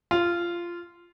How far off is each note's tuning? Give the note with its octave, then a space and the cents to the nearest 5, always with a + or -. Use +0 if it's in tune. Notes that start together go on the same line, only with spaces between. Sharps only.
F4 -15